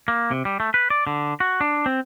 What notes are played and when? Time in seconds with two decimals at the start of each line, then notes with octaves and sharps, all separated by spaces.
0.08 A#3
0.31 C3
0.45 G3
0.60 A3
0.74 B4
0.90 D5
1.07 D3
1.40 F#4
1.61 D4
1.86 C4